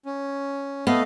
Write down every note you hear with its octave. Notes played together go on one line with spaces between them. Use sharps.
C#4
A3 B3 D#5 F5